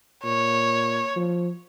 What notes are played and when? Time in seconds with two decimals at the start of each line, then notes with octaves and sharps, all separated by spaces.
0.24 A#2 C#5
1.16 F3